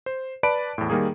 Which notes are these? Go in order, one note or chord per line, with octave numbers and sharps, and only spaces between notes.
C5
B4 D5 A5 B5 D7
E2 A2
D#3 G3 A#3 G#4